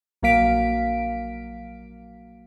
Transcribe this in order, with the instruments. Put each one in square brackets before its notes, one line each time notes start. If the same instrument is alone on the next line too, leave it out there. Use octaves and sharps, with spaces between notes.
[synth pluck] A#1 F#3 A#3 F5 B6 D7